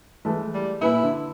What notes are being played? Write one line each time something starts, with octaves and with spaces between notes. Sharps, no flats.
E3 G#3 A3
G3
A#2 E4 B4 G#5
D3